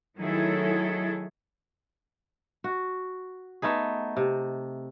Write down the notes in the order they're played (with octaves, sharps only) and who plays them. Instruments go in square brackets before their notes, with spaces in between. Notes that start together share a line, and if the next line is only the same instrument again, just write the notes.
[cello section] D#3 F#3 A3 E4 G#4 A4
[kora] F#4
A3 B3 D#4 G#4
C3